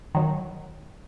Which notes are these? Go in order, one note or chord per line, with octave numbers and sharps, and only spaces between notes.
D#3 F#3